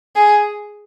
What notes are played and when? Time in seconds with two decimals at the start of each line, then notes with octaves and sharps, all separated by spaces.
0.16 G#4